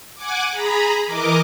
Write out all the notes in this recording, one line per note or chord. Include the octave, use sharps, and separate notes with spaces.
F#5 G#5 D6
G#4 A#5 B5
E3 A#4 D#5 D6